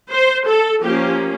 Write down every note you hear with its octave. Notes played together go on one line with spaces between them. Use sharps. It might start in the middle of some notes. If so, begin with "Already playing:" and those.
C5
A4
F3 A#3 C#4 G4